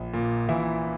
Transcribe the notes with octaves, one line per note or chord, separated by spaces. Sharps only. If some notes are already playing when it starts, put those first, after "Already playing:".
Already playing: A#1
A#2
A#2 E3 E4